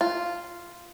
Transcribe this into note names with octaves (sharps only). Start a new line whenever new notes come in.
F4